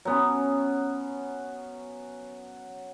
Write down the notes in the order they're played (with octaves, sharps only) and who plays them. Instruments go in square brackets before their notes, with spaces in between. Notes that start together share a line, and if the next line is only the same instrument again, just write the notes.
[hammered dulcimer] F#3 B3 C#4